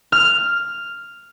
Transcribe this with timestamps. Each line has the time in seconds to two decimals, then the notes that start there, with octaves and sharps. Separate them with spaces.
0.12 F6